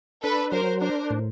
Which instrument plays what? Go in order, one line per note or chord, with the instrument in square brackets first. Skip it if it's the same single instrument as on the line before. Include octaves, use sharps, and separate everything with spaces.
[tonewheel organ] D4 [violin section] A4 B4
[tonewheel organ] F#3 [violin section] A#4 C5
[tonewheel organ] D4 [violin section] A#4 C5
[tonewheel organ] A2